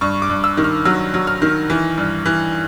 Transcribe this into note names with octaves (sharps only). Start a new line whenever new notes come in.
G2 C#6
D6
G2
E6
D#3
F6
F#3 E6
F#3
F6
D#3
E3
G2
E3